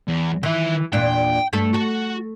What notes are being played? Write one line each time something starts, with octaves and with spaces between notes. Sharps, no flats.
E2
D#3 E3 E5
E2 A#2 D4 G5
G2 A3 A4
F#4 A4